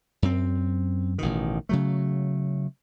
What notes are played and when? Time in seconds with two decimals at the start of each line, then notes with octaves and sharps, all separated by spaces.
0.22 F#2 C4
1.18 A1 B2 D#3
1.69 C#3 F#3 A3